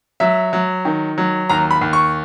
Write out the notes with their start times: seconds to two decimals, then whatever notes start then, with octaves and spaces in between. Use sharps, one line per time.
0.20 F#3 E5
0.53 F#3
0.85 D#3
1.18 F#3
1.49 D#2 A#5
1.71 B5
1.81 D#2
1.93 C#6